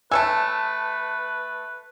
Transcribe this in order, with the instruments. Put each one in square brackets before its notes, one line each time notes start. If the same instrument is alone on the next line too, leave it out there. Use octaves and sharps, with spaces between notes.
[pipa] A3 C#5 G#5 [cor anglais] B4 [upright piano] A5 E6